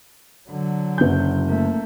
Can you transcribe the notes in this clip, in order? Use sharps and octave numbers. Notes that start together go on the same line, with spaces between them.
D3 F#3
F#1 G6
A3 A#3